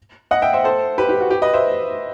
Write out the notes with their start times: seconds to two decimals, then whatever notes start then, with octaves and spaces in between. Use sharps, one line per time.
0.31 D#5 F#5
0.42 E5 G5
0.53 C5 E5
0.64 A4 C5
0.98 G4 B4
1.09 G4
1.20 F#4
1.30 G4
1.42 B4 D#5
1.54 C5 E5